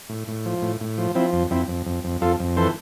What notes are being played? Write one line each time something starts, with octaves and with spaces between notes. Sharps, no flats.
A2
A2
F3
A2
A2
F3
F3 C4 E4
F2
F2 C4 E4
F2
F2
F2
F2 F4 A4
F2
E3 A4 C5